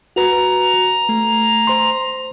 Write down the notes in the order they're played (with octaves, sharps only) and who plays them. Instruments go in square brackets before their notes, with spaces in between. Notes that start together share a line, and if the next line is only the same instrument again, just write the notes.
[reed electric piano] F#4 B4 [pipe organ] A#5
[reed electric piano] A3
C5 C6